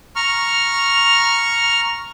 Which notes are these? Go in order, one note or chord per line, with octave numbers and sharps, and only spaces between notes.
A#5 C#6 F6